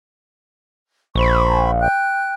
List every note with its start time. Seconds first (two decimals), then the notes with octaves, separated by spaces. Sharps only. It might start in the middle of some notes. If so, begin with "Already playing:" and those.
1.15 A#1 C5 B5 C#6
1.80 G5 F#6